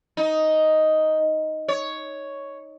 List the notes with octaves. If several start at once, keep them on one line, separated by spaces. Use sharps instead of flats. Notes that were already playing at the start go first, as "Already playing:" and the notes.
D#4
C#5